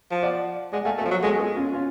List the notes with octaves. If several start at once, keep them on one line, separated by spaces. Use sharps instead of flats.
F3
D5 F#5
G#3 D5 F#5
A3 F5 G#5
A3 F#4 A4
F3
F#3
G#3 F#4 A4
F4 G#4
C#4 F4
C#4 F4